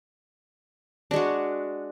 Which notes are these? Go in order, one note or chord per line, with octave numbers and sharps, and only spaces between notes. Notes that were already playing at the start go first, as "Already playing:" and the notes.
G#3 D4 F#4